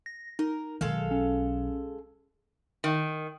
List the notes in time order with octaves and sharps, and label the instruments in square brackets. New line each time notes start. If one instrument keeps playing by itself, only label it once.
[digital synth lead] A#6
[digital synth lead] D#4 [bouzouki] A#4
[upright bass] B1 [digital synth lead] D#3 [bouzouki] G#3 A4 F5
[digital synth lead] C#4
[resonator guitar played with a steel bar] D#3